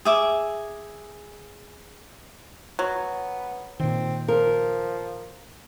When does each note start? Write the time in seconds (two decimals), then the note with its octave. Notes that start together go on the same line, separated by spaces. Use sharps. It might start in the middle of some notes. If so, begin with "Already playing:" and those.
0.05 G#4 E5 D6
2.79 F#3 B3
3.80 A#2 D#3 C4
4.28 F3 A#4